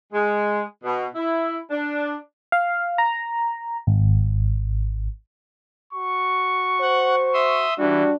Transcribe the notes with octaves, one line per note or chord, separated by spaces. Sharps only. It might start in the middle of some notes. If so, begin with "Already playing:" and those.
G#3
B2
E4
D4
F5
A#5
G#1
F#4 C#6
C5 F#5
E5 C6 D#6
E3 G3 D4 F#4